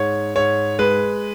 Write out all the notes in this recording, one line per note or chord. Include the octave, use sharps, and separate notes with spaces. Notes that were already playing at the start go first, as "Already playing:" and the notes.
Already playing: G#2 C#5
G#2 C#5
G#3 B4